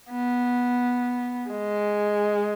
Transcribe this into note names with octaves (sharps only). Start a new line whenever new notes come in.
B3
G#3